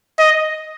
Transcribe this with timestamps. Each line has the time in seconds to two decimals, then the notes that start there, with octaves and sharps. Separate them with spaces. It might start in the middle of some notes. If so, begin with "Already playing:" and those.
0.19 D#5